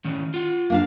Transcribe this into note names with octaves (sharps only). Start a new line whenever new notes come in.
A2 D#3 C#4
F4 F#5
A#3 D4 F5